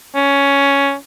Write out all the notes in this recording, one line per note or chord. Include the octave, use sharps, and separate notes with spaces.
C#4